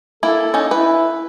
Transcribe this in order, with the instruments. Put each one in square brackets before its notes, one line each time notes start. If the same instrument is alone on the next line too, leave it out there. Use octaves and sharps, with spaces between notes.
[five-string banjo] A#3 E4 [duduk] A4
[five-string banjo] C#4 D#4
[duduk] E4 [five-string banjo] B4